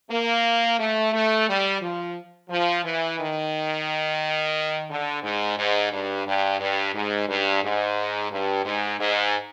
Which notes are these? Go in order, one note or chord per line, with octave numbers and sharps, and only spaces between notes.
A#3
A3
A3
G3
F3
F3
E3
D#3
D3
G#2
G#2
G2
G2
G2
G#2
G2
G#2
G2
G#2
G#2